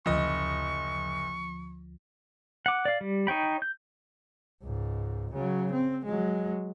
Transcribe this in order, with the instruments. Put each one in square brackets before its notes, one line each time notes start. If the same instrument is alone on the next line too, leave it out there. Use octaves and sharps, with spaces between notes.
[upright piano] F#1 D#5 [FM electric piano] D2 F3 [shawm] C#6
[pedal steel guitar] F#5 D6
D5 F5
G3
D#4 C#5 G5 B5
G6
[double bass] C#2 G#2
C#3 F#3
C4
F#3 G#3